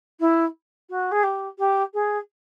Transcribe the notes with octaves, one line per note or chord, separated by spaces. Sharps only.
E4
F#4
G#4
G4
G4
G#4